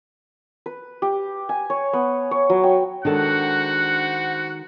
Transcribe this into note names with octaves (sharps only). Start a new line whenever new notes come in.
B4
G4
G#5
C#5
B3
C#5
F#3
G5
D#3 G#3 D4 F#4 A4 C5 F#5